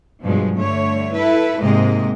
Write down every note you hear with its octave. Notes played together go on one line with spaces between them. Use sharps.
G2 B2 F3 F#3 G#3
G2 D3 A3 C#5
E4 A4 B4
G#2 C3 G#3 A#3 D#5